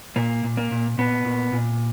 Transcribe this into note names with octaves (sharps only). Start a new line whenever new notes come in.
A#2 A#3
A#2
A#3
A#2
A#2 B3
A#2
A#2